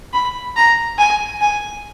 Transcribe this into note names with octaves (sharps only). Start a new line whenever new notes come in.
B5
A#5
G#5
G#5